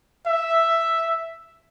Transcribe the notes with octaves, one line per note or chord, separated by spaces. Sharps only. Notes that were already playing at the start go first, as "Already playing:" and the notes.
E5